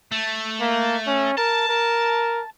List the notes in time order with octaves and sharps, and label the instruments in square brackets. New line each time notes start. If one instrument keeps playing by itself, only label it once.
[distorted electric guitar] A3
[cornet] A#3
C#4
[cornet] A#4 [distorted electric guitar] A5
[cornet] A#4